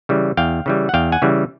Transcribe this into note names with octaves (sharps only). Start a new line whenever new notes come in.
C#3 E3 G3
E2 F5 G5
C#3 E3 G3
F#5
E2 F5 G5
F#5 G#5
C#3 E3 G3